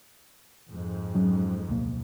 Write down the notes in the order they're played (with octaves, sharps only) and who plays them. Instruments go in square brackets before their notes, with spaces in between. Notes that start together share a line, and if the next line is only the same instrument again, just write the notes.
[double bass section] F2 G#2
[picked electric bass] F#3 C#4
D1 B1 A#3